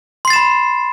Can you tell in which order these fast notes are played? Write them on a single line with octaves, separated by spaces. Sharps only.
C6 C7 A6 E7 B5